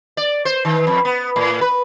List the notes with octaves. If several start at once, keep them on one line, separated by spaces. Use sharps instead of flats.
D5
C5
D#3
F2
B3
A2
B4